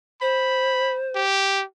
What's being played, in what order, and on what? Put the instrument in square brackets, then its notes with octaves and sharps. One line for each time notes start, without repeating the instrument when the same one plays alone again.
[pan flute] C5 [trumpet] B5
[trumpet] G4